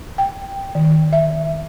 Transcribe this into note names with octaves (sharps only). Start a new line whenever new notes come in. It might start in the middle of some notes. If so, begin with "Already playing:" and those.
G5
D#3
E5